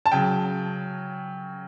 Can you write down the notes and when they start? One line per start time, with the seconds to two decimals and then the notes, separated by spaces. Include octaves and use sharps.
0.06 A5
0.12 C#3 F#3 G5